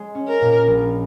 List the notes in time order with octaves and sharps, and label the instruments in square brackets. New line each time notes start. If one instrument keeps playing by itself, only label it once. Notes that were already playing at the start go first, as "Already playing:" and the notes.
Already playing: [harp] G#3
C#4
[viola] A#4
[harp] A#2
A#1